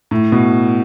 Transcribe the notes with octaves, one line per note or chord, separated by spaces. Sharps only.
A2
B2